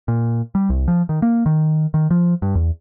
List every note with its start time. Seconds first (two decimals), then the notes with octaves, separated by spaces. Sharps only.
0.08 A#2
0.55 G3
0.69 C2
0.88 F3
1.09 D#3
1.22 A#3
1.46 D#3
1.94 D#3
2.11 F3
2.42 G2
2.55 E2